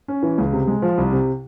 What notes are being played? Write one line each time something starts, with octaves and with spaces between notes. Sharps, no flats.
C#4
E3
C#2
C3
G#3
F3
C2
C3